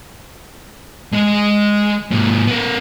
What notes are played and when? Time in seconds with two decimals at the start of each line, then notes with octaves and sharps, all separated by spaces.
1.12 G#3 D#5
2.11 G#2 A#3
2.48 B3 A#4